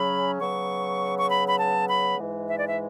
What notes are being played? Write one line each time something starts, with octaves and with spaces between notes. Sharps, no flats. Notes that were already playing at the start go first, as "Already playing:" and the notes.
Already playing: C#3 F#3 C#4 B5
C#3 F#3 B3 C#6
C#6
B5
B5
A5
B5
G#2 E3 G#3
E5
D5
E5